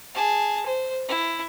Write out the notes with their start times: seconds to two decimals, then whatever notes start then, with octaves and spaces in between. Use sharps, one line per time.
0.15 G#4 A5
0.66 C5
1.08 E4